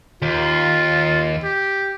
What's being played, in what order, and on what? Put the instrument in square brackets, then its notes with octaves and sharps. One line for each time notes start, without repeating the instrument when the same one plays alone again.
[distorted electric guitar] D#2 [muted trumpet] F4
[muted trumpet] G4